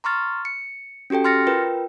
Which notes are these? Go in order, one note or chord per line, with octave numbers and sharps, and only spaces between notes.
A#5 C6 C#6 F6 A6
C#7
C#4 F#4 G4 A4 G5
C6 F6 A6 A#6 C#7
F4 A#4 B4 G5